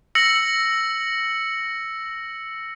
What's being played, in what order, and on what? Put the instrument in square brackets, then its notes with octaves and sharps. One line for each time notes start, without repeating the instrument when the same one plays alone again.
[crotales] E6 A#6 C#7 F#7